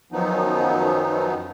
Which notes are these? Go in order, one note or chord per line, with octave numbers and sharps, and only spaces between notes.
F#2 D#3 F3 F#3 B3 D#4